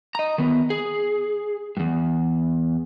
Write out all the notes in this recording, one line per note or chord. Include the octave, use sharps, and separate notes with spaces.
D#5 A#5
D#3 B3
G#4
E2 G2